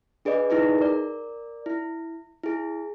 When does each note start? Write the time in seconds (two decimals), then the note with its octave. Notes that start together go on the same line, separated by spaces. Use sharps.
0.25 D4 G#4 B4 D5 D#5
0.50 D#4 E4 G#4 B4
0.78 A#4 D5
1.66 E4
2.43 E4 G#4